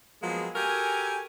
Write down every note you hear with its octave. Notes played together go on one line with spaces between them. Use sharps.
F3 F#3 G#3 A#3 B3 G#4
F#4 G4 A4 A#4 G#5